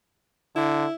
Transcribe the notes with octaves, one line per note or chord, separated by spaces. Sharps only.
D3 E4